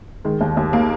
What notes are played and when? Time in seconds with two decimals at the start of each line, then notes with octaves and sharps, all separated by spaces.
0.25 D#3 G#3
0.41 D#2
0.57 D#2
0.73 A#3